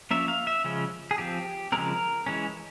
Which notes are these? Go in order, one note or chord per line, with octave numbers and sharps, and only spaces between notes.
F3 A#3 C#4 E5
F5
E5
C#3 F3 G#3 C#4
G#4
F3 C4 G4
C#3 F3 G#3 C4 A#4
E3 G#3 C#4